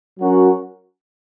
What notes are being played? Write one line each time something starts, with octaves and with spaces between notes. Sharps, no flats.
F#3 C#4 F#4 A#4